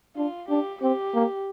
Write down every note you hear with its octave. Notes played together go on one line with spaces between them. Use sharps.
D4 F4
D4 G4
C4 G4
A#3